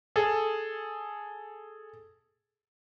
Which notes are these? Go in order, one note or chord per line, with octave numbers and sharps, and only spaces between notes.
G#4 A4